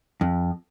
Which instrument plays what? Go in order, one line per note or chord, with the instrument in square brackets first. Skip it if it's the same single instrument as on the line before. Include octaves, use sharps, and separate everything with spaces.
[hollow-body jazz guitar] F2